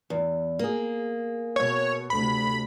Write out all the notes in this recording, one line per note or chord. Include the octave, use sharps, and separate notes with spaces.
E2
A#3 G#4
B2 C#5
D2 C3 B5